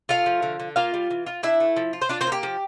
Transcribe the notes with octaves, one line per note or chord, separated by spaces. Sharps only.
A3 F4 F5
F3
D3
D3
A#3 F4 F5
G3
E3
F4
D4 E4 E5
A3
F3
F4
C5
D4 F4 D5
C4 C5
A#3
G4
F3